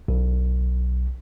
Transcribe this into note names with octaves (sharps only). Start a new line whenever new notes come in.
B1